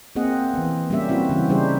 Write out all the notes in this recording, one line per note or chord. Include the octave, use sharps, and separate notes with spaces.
A#3 C4 G#4 D#5 F#5
E3 B3
G3 A#3 C#4 G4 E5
C4 E4 F#4
C#3 E3 C#4
C#3 G3 D#4 G4 G#4 C5